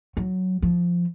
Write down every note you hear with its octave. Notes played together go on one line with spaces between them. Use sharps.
F#3
F3